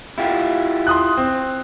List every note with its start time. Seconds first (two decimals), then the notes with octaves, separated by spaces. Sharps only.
0.18 E4 F4 G4
0.87 C6 D#6 F#6
1.18 C4